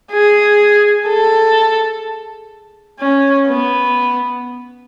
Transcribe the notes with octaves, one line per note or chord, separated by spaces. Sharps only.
G#4
A4
C#4
B3